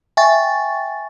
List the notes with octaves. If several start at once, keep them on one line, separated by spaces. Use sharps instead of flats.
E5 G5 G#5 C#6 A6